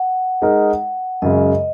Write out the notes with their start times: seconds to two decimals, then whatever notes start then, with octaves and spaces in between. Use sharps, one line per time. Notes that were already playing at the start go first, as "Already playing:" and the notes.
Already playing: F#5
0.42 G#3 D#4 A#4 D#5
1.22 F#2 C#3 G#3 D#5